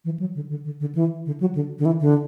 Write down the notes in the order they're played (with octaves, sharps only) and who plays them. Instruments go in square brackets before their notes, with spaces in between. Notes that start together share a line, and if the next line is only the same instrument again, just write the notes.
[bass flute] E3
F#3
D3
D3
D3
D3
E3
D3
F#3
D3
D3
E3
D3